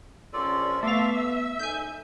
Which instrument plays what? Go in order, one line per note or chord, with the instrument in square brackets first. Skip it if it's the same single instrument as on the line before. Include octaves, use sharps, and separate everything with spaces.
[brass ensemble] A#1 [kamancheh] C#4 [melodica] F4 A4 D5
[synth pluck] A3 F5 [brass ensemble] B3 [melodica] A4 C6 D6 [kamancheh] E5
[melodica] E6
[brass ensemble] F#1 D#4 A4 [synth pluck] G#5 G6